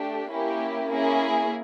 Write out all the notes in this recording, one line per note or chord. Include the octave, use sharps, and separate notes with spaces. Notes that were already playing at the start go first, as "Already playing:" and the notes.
Already playing: A3 D4 G4
A#3 C#4 E4 G4
A#3 C#4 E4 G#4